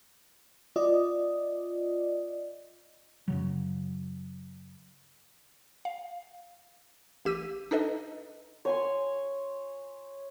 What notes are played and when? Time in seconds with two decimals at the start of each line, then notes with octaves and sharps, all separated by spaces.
0.76 F4 D5 D#5
3.28 F#2 C#3 F#3
5.85 F5
7.25 A1 G4 E6 D#7
7.71 D4 D#4 A4 B4 D#5
8.65 C#5 G#5 C6